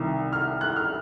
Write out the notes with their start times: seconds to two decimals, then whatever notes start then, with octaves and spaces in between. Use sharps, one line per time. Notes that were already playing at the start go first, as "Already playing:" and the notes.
Already playing: C2 C3 D#3
0.33 F6
0.61 F#6
0.76 F6